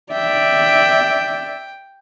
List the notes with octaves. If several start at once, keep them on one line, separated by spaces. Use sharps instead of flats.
D5 E5 G5